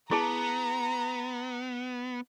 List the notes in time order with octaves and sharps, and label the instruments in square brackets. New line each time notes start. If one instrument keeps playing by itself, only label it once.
[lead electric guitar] B3 [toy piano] E4 G#4 A5 [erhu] A#5